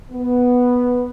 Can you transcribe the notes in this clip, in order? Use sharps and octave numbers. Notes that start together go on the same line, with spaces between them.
B3